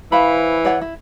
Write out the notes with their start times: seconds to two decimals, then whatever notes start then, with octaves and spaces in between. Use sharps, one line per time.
0.12 E3 C5 F5 B5
0.65 C#5 D5 F#5
0.81 E4